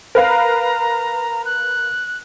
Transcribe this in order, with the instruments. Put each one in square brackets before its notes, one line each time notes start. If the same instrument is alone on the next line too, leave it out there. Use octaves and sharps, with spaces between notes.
[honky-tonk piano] A#4 B4 F5 [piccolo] A#5
[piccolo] F#6